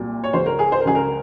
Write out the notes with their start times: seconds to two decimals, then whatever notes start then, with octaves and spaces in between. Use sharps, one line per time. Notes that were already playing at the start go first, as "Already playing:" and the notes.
Already playing: C2 A#2 F#3
0.24 C#5
0.33 C#2 C#3 F#3 C5
0.46 A#4
0.59 G#4
0.72 C5
0.80 A#4
0.85 C#2 C#3 F#3 G#4
0.95 A#4